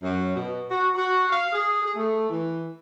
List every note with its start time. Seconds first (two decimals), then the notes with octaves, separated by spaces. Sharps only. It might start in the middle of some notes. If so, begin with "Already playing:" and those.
0.03 F#2
0.36 B2
0.71 F#4
0.95 F#4
1.29 F5
1.52 G#4
1.82 G#4
1.96 A3
2.30 E3